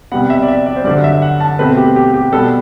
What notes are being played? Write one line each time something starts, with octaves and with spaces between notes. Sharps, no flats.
C3 G3 B3 F#5
E5
D5
E5
D5
C5
G2 D3 F#3 D5
E5
F#5
A5
B2 A3 C4 B4
G4
G4
G4
B2 G3 B3 A4